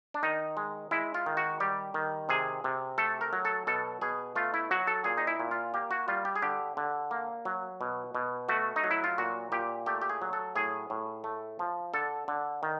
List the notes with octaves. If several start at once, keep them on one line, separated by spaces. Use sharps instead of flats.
D4
D#3 D#4
G#3
G#3 E4
F4
D#3
F#4
G3 G4
D#3
C3 G#4
C3
A3 A4
A#4
F#3
A4
B2 A4
B2 G#4
A3 F4
E4
F#3 F#4
A4
A#2 G#4
D#4
E4
A#2
F4
A#3 G4
F#4
G3 F4
G4
G#4
D3 G4
D3
A#3
F#3
B2
B2
A3 F#4
D#4
F#3
E4
F4
A#2 F#4
A#2 G4
A3 G4
G4
G#4
F#3
A4
A2 G#4
A2
A3
F3
D3 A4
D3
D#3